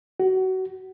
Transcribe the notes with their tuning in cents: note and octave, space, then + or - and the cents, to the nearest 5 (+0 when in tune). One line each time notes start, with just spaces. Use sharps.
F#4 +25